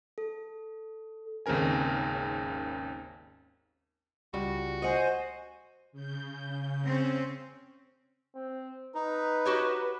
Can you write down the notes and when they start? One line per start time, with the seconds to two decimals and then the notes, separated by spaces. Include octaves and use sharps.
0.18 A4
1.46 G#1 D#2 C#3 C4 A#4 G#5
4.34 C#2 G3 F#4
4.82 C5 D#5 F#5 G#5
5.92 C#3 G6
6.86 C4 C#4
8.35 C4
8.95 D#4 B4
9.45 F#4 G4 C#5